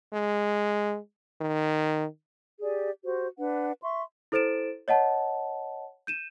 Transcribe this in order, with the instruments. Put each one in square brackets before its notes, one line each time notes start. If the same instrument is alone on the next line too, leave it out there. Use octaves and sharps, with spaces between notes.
[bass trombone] G#3
D#3
[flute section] G4 G#4 D5
F#4 G4 C5
D4 B4 F#5
E5 C6 C#6
[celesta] E4 A4 C5 A6 D7 E7
C#5 D#5 F#5 A5
G6 D#7 E7